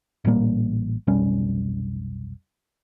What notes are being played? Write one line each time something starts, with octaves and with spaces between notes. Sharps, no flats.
A1 A#2 G3 A#3
F1 B1 G3 C#4